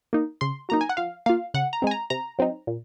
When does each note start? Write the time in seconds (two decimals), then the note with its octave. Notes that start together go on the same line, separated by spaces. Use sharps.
0.13 A#3 D#4
0.41 C#3 C6
0.69 F#3 A#3 D#4 A#5
0.81 G#5
0.89 F#5
0.97 F3 F5
1.26 A#3 F4 F5
1.54 C#3 F#5
1.73 A#5
1.82 G#3 C4 G#5
1.91 A#5
2.10 C3 A#5
2.39 F#3 C4 D#4
2.67 A#2